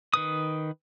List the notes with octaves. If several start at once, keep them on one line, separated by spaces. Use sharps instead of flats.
D#3 B4 D#6